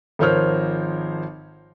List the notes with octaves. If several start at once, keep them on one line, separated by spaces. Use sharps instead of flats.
G#1 F3 A#4 C5 C#5 F6